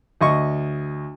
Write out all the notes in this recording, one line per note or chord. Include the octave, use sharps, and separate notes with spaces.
D2 D#5 C#6